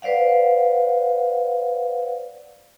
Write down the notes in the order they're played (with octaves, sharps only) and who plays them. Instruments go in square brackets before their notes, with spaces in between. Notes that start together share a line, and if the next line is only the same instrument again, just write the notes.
[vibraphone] B4 C5 D5 F5 F#5